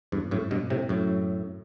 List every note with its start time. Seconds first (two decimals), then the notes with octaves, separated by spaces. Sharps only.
0.12 E2 G2
0.31 F#2 A2
0.51 G2 B2
0.70 A2 C3
0.89 F#2 A2